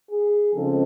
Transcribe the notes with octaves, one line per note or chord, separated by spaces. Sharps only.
G#4
C#3 F3 G#3 C4 D#4 A4